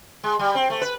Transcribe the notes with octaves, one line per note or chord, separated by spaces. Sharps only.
G#3
G3
C4
A3
B4